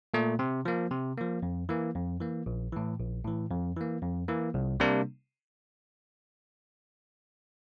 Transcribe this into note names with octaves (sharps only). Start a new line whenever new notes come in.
A#2 A3
C3
F3 A#3
C3
F3 A#3
F2
E3 A#3
F2
E3 A#3
A#1
A2 E3
A#1
A2 E3
F2
E3 A#3
F2
E3 A#3
C2
C3 G3 A#3 D4